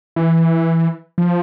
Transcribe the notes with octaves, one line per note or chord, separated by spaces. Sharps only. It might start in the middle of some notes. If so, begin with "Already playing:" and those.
E3
F3